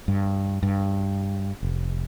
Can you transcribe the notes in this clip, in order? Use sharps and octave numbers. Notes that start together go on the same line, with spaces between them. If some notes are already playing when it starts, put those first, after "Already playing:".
G2
G2
F1